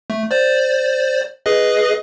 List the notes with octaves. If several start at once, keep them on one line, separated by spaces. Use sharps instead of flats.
A3
C5 D5
G#4 B4 D#5